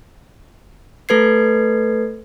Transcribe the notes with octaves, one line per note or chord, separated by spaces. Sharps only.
A3 A4 B4 G#6 C7